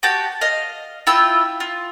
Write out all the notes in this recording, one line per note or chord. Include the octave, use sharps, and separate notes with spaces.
F#4 G4 A5 G6
D#5 F5
E4 F4 G5 E6
F4